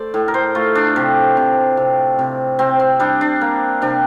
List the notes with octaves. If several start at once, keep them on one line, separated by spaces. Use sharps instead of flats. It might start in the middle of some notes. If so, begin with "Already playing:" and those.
Already playing: A3 C5 D5
A2
A#4
C5
A3 F4
D4
C3
C3
C3
C3
C3 C4
C4
G3 D4
D4
A#3
C3 D4